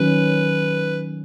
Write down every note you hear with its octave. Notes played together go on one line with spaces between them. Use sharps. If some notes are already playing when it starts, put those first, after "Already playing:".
Already playing: D#3 F#3 C#4 B4